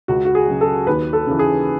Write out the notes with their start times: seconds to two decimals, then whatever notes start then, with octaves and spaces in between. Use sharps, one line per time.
0.08 C#2 F#4
0.25 F#4
0.35 G#4
0.48 C#3 F#3
0.61 A4
0.87 D#2 B4
1.13 A4
1.26 C#3 E3
1.39 G#4